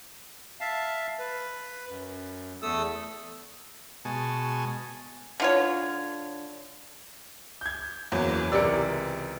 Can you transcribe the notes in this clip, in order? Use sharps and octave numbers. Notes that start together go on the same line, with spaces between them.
E5 F5 A5
B4
F#2
E2 A3 A4 D#6 E6
B2 G#3 G#5 A5 C#6
D3 F4 C#5
G6 G#6
F#1 E2 F#3 A#3
C#2 C3 E3 G4 A#4 D5 E6 C#7